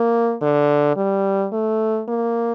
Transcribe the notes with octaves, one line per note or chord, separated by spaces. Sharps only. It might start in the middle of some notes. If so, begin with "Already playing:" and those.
Already playing: A#3
D3
G3
A3
A#3